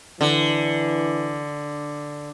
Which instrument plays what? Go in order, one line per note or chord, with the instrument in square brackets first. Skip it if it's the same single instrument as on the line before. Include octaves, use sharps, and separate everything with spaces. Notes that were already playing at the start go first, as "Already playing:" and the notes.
[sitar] D3 [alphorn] E3